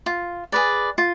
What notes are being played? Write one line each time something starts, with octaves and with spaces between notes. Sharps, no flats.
F4
G#4 B4 D5
F4